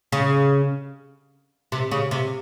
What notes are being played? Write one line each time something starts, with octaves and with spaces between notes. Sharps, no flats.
C#3
C3
C#3
C3